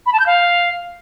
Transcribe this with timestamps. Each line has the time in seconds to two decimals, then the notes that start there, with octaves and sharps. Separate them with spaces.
0.06 B5
0.13 A5
0.20 G6
0.26 F5